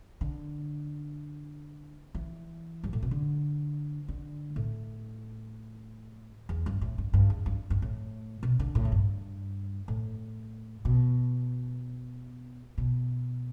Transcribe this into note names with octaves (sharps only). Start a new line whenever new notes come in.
D3
E3
G2
A2
B2
D3
D3
A2
E2
G2
A2
G2
G2
E2
G2
G2
A2
B2
D3
A2
E2
G2
A2
B2
B2